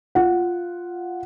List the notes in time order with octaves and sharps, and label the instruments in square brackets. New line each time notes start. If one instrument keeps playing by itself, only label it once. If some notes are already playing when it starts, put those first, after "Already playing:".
[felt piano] F4 F#5